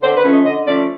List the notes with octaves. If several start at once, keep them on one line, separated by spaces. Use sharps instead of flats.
D3 C5
B4
F3 A3 C#4
D#5
D3 D#5
F3 A3 C#4 D5